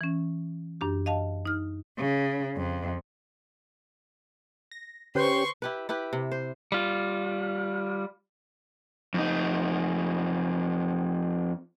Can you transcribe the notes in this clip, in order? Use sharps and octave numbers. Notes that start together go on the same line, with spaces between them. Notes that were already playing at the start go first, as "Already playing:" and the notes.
E3 C#4
F#2 D4 G4
D#5 F5 A5
D#4 F6
C#3
F2
A#6
D3 C#4 G4 B4 C5 C6 C#6
E4 G4 B4
E4 G4 B4
C3
C5
G3 F4
F2 D#4